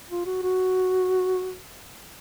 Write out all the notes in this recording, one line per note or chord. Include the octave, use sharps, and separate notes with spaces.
F4
F#4
F#4